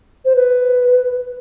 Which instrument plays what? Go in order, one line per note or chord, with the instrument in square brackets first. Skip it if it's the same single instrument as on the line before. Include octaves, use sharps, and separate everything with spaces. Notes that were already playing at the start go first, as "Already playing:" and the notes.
[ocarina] C5
B4